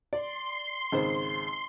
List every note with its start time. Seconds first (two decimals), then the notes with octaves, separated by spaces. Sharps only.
0.13 D5 C6
0.92 G#1 C#3 C5